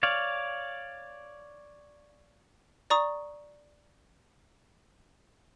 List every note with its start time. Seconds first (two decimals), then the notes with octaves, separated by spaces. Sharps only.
0.03 C#5 D5 F5
2.90 D5 A#5 C#6 D#6